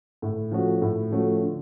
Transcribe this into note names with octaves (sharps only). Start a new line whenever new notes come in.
A2
F3 A3 C#4 F#4
A2
F3 A3 C#4 F#4
D3